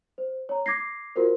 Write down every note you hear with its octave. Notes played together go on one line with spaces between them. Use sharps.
C5
C#5 A#5
D6 G#6 A#6 C7
F4 F#4 A#4 C5